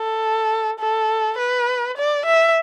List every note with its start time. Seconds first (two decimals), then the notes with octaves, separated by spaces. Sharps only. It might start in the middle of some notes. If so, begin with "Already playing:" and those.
Already playing: A4
0.79 A4
1.38 B4
1.97 D5
2.26 E5